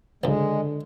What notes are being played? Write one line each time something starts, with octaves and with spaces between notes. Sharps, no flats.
C#2 F#2 D3 G#3